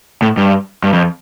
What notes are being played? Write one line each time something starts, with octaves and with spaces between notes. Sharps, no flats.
A2
G2
G2
F2